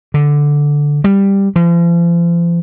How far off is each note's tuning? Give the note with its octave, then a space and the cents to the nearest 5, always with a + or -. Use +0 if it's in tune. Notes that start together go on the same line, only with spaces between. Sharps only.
D3 -5
G3 +10
F3 -40